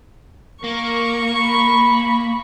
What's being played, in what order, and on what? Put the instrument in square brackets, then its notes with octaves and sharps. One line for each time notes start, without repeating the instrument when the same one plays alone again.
[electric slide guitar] A#3 [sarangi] A#4 [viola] C#6
[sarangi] B5